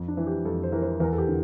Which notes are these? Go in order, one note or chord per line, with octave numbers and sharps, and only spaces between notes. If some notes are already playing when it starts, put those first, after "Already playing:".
Already playing: F2
D4
E3
G4
F2 A4
C5
E3 A#4
C5
E2 A#4
A4
G4
D3